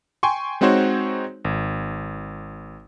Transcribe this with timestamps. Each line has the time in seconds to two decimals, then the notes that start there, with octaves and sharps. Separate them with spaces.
0.23 G5 G#5 C6 C#6
0.61 G#3 C4 D#4 F#4 C5 C#5
1.45 G#1